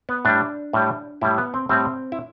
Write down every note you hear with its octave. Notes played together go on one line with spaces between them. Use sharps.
B3
A2 G3 D4
A2 G3
A2 G3 E4
B3
C4
A2 G3 C4
E4